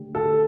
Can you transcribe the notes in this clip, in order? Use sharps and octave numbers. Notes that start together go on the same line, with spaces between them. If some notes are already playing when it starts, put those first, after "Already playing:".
Already playing: D3 A3 D4 G4
A4